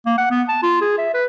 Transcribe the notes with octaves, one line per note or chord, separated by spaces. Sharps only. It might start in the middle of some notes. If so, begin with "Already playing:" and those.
A#3
F#5
B3
A5
F4
G#4
E5
B4